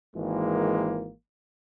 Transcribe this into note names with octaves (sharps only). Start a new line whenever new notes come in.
G#1 E3 G#3 A#3